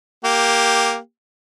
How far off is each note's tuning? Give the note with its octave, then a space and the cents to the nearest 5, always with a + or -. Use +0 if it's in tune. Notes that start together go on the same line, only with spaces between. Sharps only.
A#3 +0 G4 +0